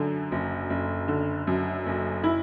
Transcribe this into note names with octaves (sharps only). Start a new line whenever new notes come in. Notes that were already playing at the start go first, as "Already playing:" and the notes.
Already playing: F#2 D3
F#1
F#1
D3
F#2
F#1
E4